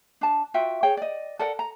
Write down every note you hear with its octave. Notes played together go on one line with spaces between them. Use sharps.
D4 A5
F4 F#4 E5 G5
G#4 C#5 G5
D5 D#5
A4 A#4 D5 F#5
A#5